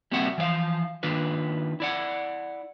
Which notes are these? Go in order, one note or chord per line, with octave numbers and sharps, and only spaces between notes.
G3 A#3 C4 F#4 E5 F#5
E3 F3 D5 F5
D#3 A#3 D4 F4 B4
E4 D5 F#5